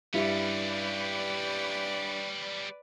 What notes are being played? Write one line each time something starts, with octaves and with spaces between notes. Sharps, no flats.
G2 G3 C#4 E4 B4 D5